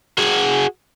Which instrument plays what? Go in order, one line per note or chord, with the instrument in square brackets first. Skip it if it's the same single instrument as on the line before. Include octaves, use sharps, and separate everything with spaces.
[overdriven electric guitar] F#4 G#4